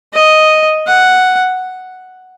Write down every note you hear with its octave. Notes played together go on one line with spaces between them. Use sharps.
D#5
F#5